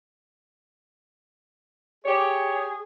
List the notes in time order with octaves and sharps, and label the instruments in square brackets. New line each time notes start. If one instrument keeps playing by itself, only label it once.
[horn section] G4 C#5 [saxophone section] G#4